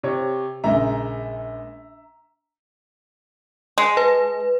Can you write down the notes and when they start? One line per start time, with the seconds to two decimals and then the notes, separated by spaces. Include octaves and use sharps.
0.03 C3 C#5
0.64 A#1 C#3 G#3 E5 A#5
3.78 G#3
3.97 B4